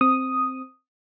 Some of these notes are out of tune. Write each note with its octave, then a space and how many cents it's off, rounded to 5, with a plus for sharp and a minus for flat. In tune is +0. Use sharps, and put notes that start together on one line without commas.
C4 +0 D#6 +0